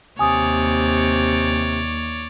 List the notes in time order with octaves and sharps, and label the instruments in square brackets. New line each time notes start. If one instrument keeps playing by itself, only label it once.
[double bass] D#2 [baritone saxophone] C3 [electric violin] C#5 D5 [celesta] G#5 D#6